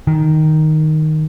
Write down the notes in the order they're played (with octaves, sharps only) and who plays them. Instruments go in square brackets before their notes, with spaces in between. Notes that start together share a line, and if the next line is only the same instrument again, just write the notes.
[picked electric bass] D#3